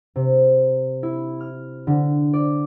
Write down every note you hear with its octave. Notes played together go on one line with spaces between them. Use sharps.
C3
E4
F6
D3
D5